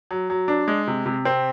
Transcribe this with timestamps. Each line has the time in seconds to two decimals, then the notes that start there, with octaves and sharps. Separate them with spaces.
0.11 F#3
0.30 F#3
0.48 D4
0.68 G#3
0.87 C3
1.06 C3
1.25 C4